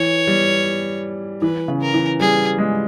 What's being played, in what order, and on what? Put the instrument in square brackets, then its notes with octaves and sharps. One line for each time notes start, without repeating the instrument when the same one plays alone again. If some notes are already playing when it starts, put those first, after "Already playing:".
Already playing: [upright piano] E3 [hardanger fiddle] C#5
[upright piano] G3
[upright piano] E3 [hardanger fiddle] B4
[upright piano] C#3
[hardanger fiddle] A#4
[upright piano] E3
[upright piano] G3 [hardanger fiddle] G#4
[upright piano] G#3